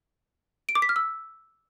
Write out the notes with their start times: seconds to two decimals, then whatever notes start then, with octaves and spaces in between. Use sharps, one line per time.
0.69 D7
0.75 D6
0.82 B6
0.89 F6
0.96 E6